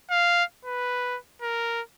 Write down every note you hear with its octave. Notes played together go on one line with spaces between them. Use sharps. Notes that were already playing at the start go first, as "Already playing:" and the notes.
F5
B4
A#4